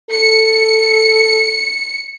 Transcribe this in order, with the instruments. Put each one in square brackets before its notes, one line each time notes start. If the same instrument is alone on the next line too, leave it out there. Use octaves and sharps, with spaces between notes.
[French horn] A4 [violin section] C#7